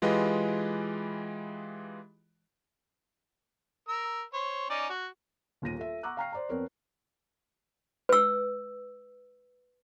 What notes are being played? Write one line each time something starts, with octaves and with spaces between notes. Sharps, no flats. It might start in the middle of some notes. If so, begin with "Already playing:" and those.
E3 G#3 F4 G4 B4 D#5
A#4 E6
C5 C#5
C#4 D#4 D5
F#4
D#1 D#2 F4 A#6 D#7
F4 A4 E5
F#5 A#5 C#6 D6 E6 F#6
F5 G5 A#5 C#6 F6 C7
C5 D5 A#5
F2 B3 C4 A#4 C#5
B4 E6